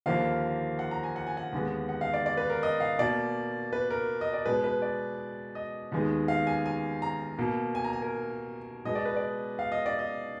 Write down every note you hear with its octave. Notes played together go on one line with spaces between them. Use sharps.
D#2 D3 F3 A#3 F5
F#5
A#5
G#5
F#5
G#5
F#5
D#2 D3 G#3 B3
F#5
F5
D5
D5
B4
A#4
D#5
F5
B2 A#3 D5
B4
A#4
D#5
D5
B2 G#3 B3 B4
B4
D5
D#5
D#2 D#3 G#3 B3
F5
G#5
G#5
A#5
B2 A#3
G#5
A#5
G#5
A#4
B2 G#3 B3 D#5
D5
B4
D5
F5
D#5
D5
D#5